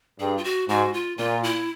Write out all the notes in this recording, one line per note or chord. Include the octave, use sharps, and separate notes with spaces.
G2 G#4
F4
F#4
G#2 F#4
F4
A#2 F4
E4